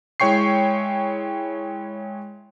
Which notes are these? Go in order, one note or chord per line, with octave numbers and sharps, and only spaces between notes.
G#3 E4 C#5 G5 C#6 C7